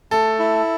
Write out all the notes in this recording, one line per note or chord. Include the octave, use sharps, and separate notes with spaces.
A3 A4
E4